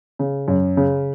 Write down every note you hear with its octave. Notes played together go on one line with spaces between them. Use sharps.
C#3
F#2
C#3